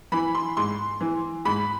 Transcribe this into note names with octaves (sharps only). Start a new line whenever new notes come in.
E3 B5
C6
G#2 C6
E3
G#2 B5